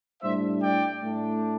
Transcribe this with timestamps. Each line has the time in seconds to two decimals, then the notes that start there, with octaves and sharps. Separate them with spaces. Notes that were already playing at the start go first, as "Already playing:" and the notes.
0.22 A2 G3 D4 C5 E5
0.62 D5 G5
1.02 A2 A3 D4